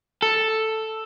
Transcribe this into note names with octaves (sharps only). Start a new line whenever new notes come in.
A4